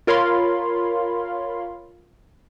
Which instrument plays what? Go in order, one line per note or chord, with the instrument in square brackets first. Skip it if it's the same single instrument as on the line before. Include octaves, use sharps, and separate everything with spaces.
[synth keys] F4 A#4 C#5 F5 B5 C6